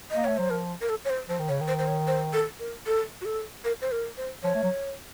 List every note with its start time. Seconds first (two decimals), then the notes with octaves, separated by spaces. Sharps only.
0.11 D#5
0.16 A#3
0.24 A3 C#5
0.37 F#3 C5
0.50 F3 A#4
0.81 A#4
0.89 A4
1.05 C#5
1.10 C5
1.29 F3 C5
1.39 D#3
1.48 C#3 C#5
1.61 D#3
1.68 C5
1.79 C5
1.88 C#5
2.07 C5
2.33 A4
2.59 A#4
2.87 A4
3.21 F#4
3.25 A4
3.65 A#4
3.82 C5
3.92 A#4
4.17 C5
4.43 F3 C#5
4.55 A3
4.63 F#3